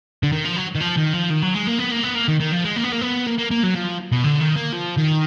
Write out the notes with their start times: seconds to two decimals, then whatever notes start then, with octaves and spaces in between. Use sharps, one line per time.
0.23 D3
0.32 D#3
0.45 F3
0.57 F#3
0.76 D#3
0.81 F3
0.97 D#3
1.14 F3
1.30 D#3
1.42 F#3
1.54 G#3
1.67 A#3
1.79 B3
1.91 A#3
2.03 B3
2.15 A#3
2.28 D#3
2.40 D#3
2.52 F3
2.65 G#3
2.76 A#3
2.84 B3
2.92 A#3
3.01 B3
3.26 A#3
3.38 A#3
3.51 A#3
3.63 F#3
3.75 F3
4.12 B2
4.24 D3
4.40 D#3
4.56 A#3
4.72 F3
4.97 D#3